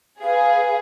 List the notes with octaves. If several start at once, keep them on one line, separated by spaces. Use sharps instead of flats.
G#4 B4 F5